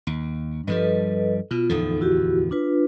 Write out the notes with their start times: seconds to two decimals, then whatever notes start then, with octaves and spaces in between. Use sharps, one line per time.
0.07 D#2
0.67 G2 F3 G3 A4 B4 D#5
1.51 B2 F4
1.69 D1 E2 F3 D#4 A4
2.01 E4 F#4 G4
2.51 D4 F4 B4